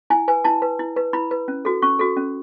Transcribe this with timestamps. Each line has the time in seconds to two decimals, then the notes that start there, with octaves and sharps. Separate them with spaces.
0.10 E4 G#5
0.28 B4 G#5
0.44 E4 A5
0.62 B4
0.79 E4
0.96 B4
1.13 E4 B5
1.31 B4
1.48 C#4
1.65 F#4 A4
1.82 C#4 C#6
1.99 F#4 A4
2.17 C#4